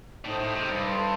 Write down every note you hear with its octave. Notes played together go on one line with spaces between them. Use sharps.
A2 D#4 A4 C5
A2
C3
G2
A4 D5 A5 C6